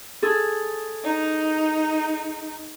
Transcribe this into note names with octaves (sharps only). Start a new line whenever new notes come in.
G#4 A4
D#4